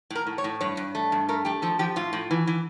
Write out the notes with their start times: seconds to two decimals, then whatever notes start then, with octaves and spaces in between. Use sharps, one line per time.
0.10 A2 A#4
0.27 A2
0.38 C#5
0.44 A2
0.61 G2 C#5
0.77 G2
0.95 A3
1.12 G2
1.29 A3 A#4
1.45 A3 G4
1.62 F3 A4
1.79 F3 G4
1.96 A2 F4
2.13 A2
2.31 E3
2.47 E3